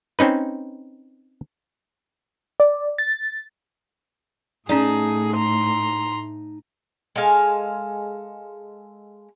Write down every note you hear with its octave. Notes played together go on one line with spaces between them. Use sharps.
C4 C#4 D#4 B4
D5
A6
A2 C#4 D#4 G#4 D5 A5
A#5 C6
G#3 A4 F5 G#5